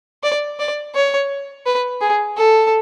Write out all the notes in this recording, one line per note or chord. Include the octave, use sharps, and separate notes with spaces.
D5
D5
C#5
B4
G#4
A4